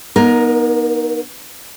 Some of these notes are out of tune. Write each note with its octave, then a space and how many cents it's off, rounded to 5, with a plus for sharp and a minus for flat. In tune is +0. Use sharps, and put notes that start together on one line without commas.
B3 -35 D#4 +0 A#4 +10